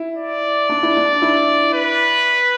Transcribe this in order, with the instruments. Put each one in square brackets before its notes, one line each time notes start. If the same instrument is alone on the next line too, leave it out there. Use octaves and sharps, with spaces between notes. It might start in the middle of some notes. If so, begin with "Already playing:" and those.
Already playing: [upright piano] E4
[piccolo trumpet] D5
[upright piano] D4
E4
D4
E4
[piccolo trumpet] B4